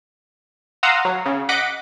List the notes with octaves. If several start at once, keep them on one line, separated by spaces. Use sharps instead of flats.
F5 F#5 A#5 C6 D#6 E6
F#3
C#3
D#5 F#5 D6 B6 D7